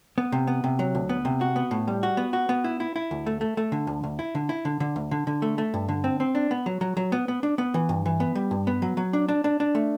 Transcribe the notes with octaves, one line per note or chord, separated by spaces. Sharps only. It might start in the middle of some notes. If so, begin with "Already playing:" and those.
B3
C3
B3
C3
F#3
D2
B3
C3
F#4
B3
A2
G3
F#4
B3
F#4
B3
E4
E4
E4
D2
A3
A3
A3
D3
D2
D2
E4
D3
E4
D3
D3
D2
D3
D3
A3
A3
G2
D3
C4
C4
D4
B3
F#3
F#3
F#3
B3
B3
D4
B3
E3
G2
E3
B3
G3
G2
B3
F#3
F#3
D4
D4
D4
D4
A3